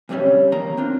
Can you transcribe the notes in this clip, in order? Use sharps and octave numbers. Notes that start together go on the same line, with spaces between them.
D2 G2 C3 F#3 G3 C#4
E2 D#3 A#3 A#5
C4 D4 F4